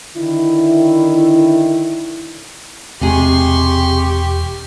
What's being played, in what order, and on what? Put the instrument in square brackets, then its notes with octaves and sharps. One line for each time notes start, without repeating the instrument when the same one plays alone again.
[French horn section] D3 D#3 E4
[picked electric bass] E1 [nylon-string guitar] C3 G#3 G#4 [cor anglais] G4 [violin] C6 C#6